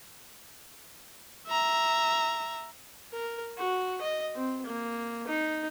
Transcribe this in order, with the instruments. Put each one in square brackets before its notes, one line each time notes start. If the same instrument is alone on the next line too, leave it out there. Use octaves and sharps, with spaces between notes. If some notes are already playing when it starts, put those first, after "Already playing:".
[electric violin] E5 A#5
[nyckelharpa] A#4
F#4
D#5
C4
A#3
D#4